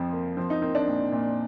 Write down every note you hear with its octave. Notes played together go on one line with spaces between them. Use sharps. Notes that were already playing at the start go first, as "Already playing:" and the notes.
Already playing: F2 F3 C4
A#3
F3 C4
D#4
A#3 C4
D4
A#2
A#2